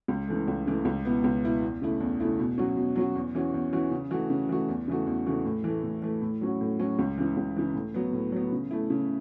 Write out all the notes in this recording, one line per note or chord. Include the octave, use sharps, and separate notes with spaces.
C#2
C#3 E3 A3
C#2
C#3 E3 A3
C#2
B2 B3 E4
C#2
B2 B3 E4
E2
C#3 A3 E4
E2
C#3 A3 E4
B2
F#3 C#4 F#4
B2
F#3 C#4 F#4
E2
E3 C#4 F#4
E2
E3 C#4 F#4
C#3
E3 A3 F#4
C#3
E3 A3 F#4
E2
C#3 E3 A3 F#4
E2
C#3 E3 A3 F#4
A2
E3 A3
A2
E3 A3
A2
F#3 C#4 F#4
A2
F#3 C#4 F#4
C#2
C#3 E3
C#2
C#3 E3
A2
F#3 B3
A2
F#3 B3
C#3
A3 E4
C#3